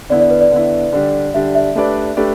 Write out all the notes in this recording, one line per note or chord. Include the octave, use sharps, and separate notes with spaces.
D3 B3 E4 D5
D5
B4
D5
D3 B3 E4
D3 G3 D4 G4
D3 G3 D4 G4 E5
E5
A3 D4 G4 B4 D5
A3 D4 G4 B4 D5